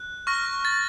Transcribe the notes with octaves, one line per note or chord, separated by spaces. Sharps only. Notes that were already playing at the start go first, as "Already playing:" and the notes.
Already playing: F#6
C#6 F6 A#6
A6